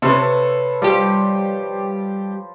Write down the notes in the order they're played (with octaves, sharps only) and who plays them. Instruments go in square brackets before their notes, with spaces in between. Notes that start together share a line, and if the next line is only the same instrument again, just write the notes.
[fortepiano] C3 [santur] A4 B4 C#5
[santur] F3 [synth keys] G3 G4